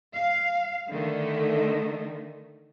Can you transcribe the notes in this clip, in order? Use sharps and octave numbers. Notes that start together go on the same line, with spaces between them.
F5
D3 D#3 A3